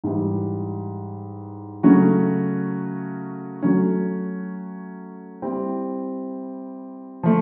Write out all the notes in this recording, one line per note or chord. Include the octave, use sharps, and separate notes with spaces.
G#2 E3 G3
C#3 F#3 A3 C#4 F#4
F#3 A3 C#4 F#4
G3 C4 E4
F3 A3